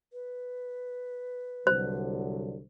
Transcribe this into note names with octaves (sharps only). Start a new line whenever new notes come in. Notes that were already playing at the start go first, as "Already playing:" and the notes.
B4
C2 D3 F#3 C5